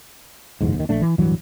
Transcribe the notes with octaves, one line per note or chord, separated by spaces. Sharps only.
F#1 B1 E2 G#2
D#2 D#3
A#1 A3 D4
E3
D1 G2 E3 F#3